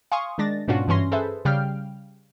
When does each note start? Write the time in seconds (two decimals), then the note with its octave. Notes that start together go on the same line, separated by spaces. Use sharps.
0.12 F5 G#5 C6 C#6 D#6
0.38 D#3 G#3 D4 A6 A#6
0.68 G#2 B2 C#4 D4 F4 F#4
0.88 G2 E3 C#4 C6 A#6
1.12 G#4 A4 B4 C5 E5
1.45 C#3 G3 F5 G5 F6